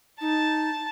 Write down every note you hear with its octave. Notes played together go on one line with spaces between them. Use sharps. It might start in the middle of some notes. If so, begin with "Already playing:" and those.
D#4 A5